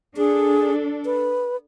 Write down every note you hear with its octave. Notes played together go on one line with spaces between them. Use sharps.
D4 G#4 A4
B4